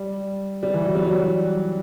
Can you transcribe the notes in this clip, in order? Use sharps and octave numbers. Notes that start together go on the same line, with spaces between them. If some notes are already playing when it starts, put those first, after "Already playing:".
Already playing: G3
G3
E3
F#3
G3
F#3
G3